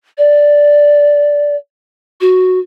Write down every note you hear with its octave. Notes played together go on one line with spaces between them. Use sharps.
D5
F#4